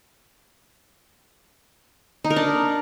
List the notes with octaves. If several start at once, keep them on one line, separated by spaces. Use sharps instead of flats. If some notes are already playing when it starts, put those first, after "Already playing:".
D#4
A#4
D4